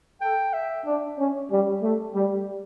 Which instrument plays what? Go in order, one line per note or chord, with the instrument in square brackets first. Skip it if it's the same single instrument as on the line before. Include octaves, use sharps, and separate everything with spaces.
[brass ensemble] A4 [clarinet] G5
[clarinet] E5
[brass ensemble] D4
C#4
G3
A3
G3